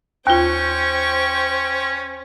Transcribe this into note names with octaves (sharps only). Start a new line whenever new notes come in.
D#2 C#4 F4 C5 G5 C#6